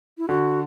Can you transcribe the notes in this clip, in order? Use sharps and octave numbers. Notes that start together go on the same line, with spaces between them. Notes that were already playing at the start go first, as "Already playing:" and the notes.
E4
D3 F#4